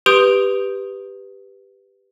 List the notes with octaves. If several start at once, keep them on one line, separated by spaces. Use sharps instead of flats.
G4 B4 C6 D#6 G6 D7